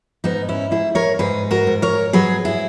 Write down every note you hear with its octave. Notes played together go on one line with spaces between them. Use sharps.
G#2 B3 D#4
C#4 E4
G#2 E4 G#4
A#4 C#5
G#2 G#4 B4
F#4 A#4
G#2
A#4 C#5
F#3 G#4 B4
E4 G#4